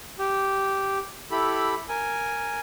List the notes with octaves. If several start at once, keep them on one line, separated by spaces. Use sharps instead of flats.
G4
E4 G4 A4 B5
A#4 G#5